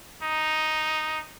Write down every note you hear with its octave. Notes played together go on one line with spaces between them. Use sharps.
D#4